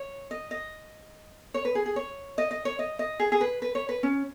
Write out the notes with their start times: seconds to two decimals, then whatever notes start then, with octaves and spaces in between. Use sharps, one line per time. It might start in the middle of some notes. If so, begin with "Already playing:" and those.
Already playing: C#5
0.31 D#5
0.51 D#5
1.54 C#5
1.65 B4
1.75 G#4
1.86 G#4
1.96 C#5
2.38 D#5
2.51 D#5
2.65 C#5
2.79 D#5
2.99 D#5
3.20 G#4
3.32 G#4
3.41 B4
3.62 B4
3.75 C#5
3.89 B4
4.03 C#4